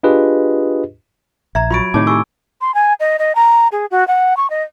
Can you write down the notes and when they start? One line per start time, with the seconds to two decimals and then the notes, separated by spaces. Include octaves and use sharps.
0.03 D4 F4 G4 G#4 B4 D#5
1.55 A#1 E5 A#5 G#6
1.71 F#3 F4 B5 C#6 A6 D7
1.94 A2 C3 D#3 G4 C#5 A5 D6
2.07 F#4 G4 G#5 C#6 E6
2.61 C6
2.74 G#5
3.00 D#5
3.19 D#5
3.35 A#5
3.72 G#4
3.91 F#4
4.08 F#5
4.37 C#6
4.50 D#5